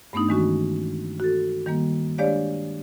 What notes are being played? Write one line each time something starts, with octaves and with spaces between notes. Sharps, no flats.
G2 A3 B3 D4 D#4
D#3 E3 G#3 C#4 F#4
F#4 A4
D#3 G3 A#3
G#3 D4 G4 C#5 D5 F5